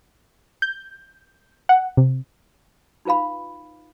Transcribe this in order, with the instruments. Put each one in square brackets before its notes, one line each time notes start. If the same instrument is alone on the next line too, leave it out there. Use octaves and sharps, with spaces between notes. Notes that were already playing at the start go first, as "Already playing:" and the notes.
[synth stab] G6
F#5
C3
[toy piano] D#4 F4 B4 F5 B5